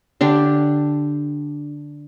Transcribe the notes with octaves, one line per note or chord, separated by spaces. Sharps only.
D3 D4 G4